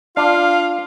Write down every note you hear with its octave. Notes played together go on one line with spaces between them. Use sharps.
D4 F4 F5